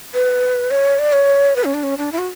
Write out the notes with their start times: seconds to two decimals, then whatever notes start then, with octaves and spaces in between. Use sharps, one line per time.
0.14 B4
0.71 C#5
0.99 D5
1.13 C#5
1.56 B4
1.64 C#4
1.74 D4
1.83 C#4
1.98 D4
2.12 E4
2.18 F#4